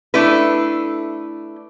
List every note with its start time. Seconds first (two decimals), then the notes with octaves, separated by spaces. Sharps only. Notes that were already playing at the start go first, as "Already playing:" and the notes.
0.14 A3 D4 E4 A4 B4